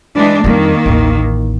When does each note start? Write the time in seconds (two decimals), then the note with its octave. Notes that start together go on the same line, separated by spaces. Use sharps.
0.15 E3 G#3 D4
0.44 F2 D#3 G3 A#3
0.86 A1 D#2